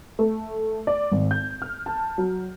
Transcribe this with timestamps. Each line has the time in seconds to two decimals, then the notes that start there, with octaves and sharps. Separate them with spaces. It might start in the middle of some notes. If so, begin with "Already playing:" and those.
0.19 A3
0.87 D5
1.12 G#1
1.31 G6
1.62 F6
1.86 A5
2.18 F#3